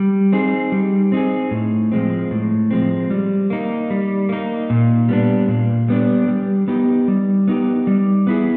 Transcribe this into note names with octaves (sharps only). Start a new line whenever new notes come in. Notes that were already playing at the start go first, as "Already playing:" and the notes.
Already playing: G3
C4 D#4 G#4
G3
C4 D#4 G#4
A2
F3 G#3 C4
A2
F3 G#3 C4
G3
A#3 D#4
G3
A#3 D#4
A#2
G3 B3 D4
A#2
G3 B3 D4
G3
B3 D#4 G4
G3
B3 D#4 G4
G3
B3 E4 G#4